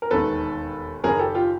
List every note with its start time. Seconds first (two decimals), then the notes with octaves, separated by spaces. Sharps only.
0.02 A#4
0.11 E1 D#2 D#3 A4 B4
1.04 F#1 F#2 D#3 G#4 A#4
1.19 G4 A4
1.35 F4 G4